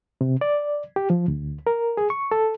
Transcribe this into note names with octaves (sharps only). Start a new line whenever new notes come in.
C3
D5
G4
F3
D2
A#4
G#4
C#6
A4